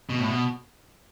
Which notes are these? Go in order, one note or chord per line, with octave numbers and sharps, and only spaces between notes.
B2
A2
B2